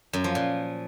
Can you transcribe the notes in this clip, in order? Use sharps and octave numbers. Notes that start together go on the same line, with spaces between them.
F#2
F3
A#2